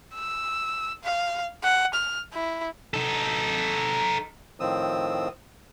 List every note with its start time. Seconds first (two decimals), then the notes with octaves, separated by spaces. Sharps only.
0.15 E6
1.03 F5
1.64 F#5
1.94 F6
2.34 E4
2.94 D#4 A4
4.60 A2 D#3 F3 C4 D#6 E6